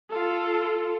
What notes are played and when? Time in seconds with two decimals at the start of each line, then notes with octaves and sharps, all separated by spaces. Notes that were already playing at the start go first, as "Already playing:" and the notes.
0.11 F4 A4